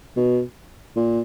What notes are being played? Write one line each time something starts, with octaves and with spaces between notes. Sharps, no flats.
B2
A#2